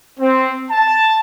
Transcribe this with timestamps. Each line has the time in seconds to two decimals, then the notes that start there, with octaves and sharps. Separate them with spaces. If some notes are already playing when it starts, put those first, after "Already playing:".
0.19 C4
0.70 A5